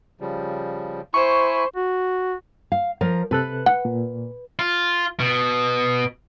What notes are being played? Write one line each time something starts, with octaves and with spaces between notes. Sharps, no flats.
C#3 F3 G3
E4 C5 G#5 B5 C#6
F#4
F5
F3 A#4
C3 A4 B4 F#6
F#5
A#2
F4
B2